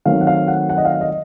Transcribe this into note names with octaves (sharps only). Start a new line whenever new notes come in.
D#3 F#3 A3 C4 F5
F#5
F5
F#5
F#5
D#5
F5
D#5